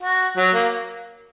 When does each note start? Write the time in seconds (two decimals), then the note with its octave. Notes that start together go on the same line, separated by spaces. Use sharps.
0.03 F#4
0.37 F#3
0.54 A#3